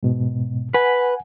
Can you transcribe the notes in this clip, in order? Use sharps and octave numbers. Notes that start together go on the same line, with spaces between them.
G#2 B2
B4 F#5 G#5